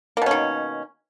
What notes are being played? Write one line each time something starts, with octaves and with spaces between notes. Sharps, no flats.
B2 D#3 A#3 C#4